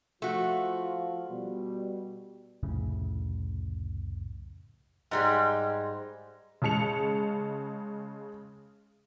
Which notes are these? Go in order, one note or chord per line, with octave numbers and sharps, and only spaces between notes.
F3 A3 F4 F#4
B2 G3
C2 F2 A2 C#3
G#2 G3 G#3
C#3 G#3 A5 C#7 F7